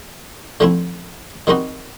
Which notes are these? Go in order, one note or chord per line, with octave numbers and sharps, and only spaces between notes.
D3 F3 A3 C4 E4
D#3 G3 C4 D#4 F#4